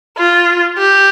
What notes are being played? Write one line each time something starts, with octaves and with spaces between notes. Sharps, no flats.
F4
G4